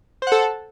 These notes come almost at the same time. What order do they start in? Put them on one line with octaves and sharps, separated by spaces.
C5 F#5 A4